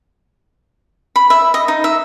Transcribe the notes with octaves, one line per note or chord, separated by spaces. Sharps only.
B5
E5
D#5
D#4
E5